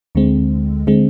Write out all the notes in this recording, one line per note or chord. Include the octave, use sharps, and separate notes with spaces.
D2 D3 G#3 C4
D3 G#3 C4